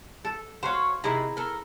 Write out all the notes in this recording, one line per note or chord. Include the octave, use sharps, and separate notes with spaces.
A4
F#4 C5 C#5 F5
C3 D#3 E4 G#4 A#5
A4 A#4